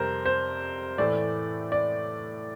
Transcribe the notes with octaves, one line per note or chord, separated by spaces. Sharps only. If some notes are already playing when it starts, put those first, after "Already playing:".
Already playing: F2 C3 G3 A#4 C5
C5
A2 E3 A3 D5
D5